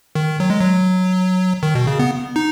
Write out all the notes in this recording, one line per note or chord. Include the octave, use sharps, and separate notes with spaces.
D#3
F#3
G#3
F#3
D#3
B2
C#3
B3
D#4